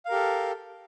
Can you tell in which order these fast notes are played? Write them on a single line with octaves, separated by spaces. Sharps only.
F5 A#4 G4 A4